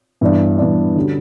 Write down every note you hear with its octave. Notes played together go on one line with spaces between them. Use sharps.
G2 E3 B3 D4
G2 E3 B3 D4
D3 G3 C#4 F#4